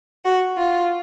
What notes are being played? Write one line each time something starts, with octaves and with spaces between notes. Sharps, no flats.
F#4
F4